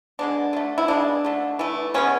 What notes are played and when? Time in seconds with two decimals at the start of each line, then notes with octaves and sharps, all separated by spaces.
0.19 D3 G#3 B3 D4
0.53 D3 A3
0.78 E4
0.88 C#3 G#3 B3 D4
1.25 D3 A3
1.59 E3 A3
1.94 B2 G#3 B3 C#4